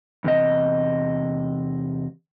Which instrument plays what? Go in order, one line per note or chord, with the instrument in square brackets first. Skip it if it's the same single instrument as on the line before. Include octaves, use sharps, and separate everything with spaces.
[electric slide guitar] E2 C3 D#5